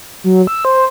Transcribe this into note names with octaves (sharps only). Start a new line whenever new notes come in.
F#3
E6
C5